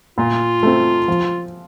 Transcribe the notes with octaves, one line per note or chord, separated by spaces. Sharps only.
A#2 F4
A3 C4
F3